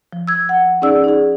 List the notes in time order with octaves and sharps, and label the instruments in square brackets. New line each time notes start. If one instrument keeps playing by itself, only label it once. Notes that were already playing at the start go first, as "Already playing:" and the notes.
[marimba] F3
E6 G#6
F#5
C#4 D#4 G#4 D5 E6
D#4 G#4